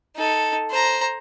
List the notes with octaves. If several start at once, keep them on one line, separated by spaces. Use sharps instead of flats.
D#4 A4
C5 A#5